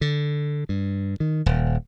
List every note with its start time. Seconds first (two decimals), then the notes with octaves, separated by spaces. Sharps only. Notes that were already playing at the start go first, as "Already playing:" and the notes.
0.01 D3
0.69 G2
1.20 D#3
1.46 D#1